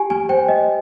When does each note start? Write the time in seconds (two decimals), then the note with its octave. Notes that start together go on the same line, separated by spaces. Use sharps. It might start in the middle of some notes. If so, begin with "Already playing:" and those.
Already playing: G4 G#5
0.10 G#5
0.29 C5 G5
0.48 D#5